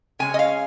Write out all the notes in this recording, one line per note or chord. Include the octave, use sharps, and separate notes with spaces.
C#3 G#3 C#4 G#5
D#5
F5